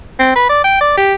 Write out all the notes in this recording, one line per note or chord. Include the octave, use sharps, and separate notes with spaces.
C4
B4
D5
G5
D5
G4